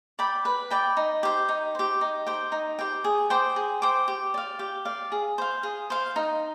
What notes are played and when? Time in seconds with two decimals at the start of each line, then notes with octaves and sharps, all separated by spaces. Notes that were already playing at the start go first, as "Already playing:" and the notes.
0.19 D5 G5 B5
0.45 B4
0.70 D5 G5 B5
0.97 D#4
1.23 G4 C5
1.49 D#4
1.75 G4 C5
2.01 D#4
2.27 G4 C5 G5
2.52 D#4
2.79 G4 C5 G5
3.04 G#4
3.30 C5 G5 D6
3.56 G#4
3.82 C5 G5 D6
4.08 G4
4.34 D5 F5
4.59 G4
4.85 D5 F5
5.12 G#4
5.38 C5 F5
5.63 G#4
5.90 C5 F5
6.16 D#4